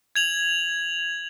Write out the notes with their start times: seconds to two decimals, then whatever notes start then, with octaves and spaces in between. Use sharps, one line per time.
0.16 G#6 F7 F#7